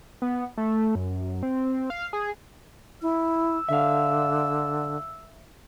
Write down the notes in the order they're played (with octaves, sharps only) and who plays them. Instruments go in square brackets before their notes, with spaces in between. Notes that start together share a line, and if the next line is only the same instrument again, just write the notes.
[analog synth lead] B3
A3
F#2
C4
F5
G#4
[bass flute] E4 [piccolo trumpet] E6
[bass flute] D3 [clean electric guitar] E5 F5